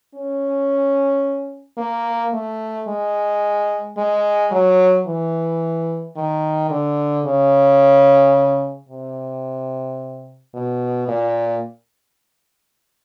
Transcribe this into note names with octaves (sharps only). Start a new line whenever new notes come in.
C#4
A#3
A3
G#3
G#3
F#3
E3
D#3
D3
C#3
C3
B2
A#2